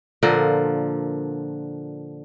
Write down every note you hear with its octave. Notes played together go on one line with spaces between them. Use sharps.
A#2 D3 F3 A#4